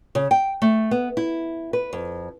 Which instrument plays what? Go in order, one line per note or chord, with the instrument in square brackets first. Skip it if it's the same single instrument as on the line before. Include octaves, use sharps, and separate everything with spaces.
[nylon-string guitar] C#3
G5
A3
B3
E4
B4
F2